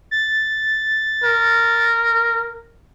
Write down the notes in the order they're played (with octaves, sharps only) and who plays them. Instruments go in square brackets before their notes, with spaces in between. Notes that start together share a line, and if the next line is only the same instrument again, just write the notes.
[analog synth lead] A6
[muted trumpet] A#4